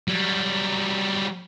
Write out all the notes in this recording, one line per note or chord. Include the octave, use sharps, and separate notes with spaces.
F#3 G3